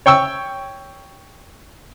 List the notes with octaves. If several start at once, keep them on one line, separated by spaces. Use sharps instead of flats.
C#5 G5 C#6 E6